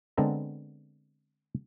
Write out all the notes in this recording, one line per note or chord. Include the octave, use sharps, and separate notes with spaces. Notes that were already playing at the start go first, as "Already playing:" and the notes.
D3 G#3 B3 C4 A4 A#5